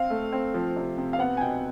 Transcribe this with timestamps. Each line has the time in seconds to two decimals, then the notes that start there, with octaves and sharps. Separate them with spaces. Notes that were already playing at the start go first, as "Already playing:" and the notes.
Already playing: C4 F5
0.10 A3
0.33 C4
0.54 F3
0.76 C3
0.98 C3
1.13 F5
1.19 B3 F#5
1.37 G#5
1.41 B2 G5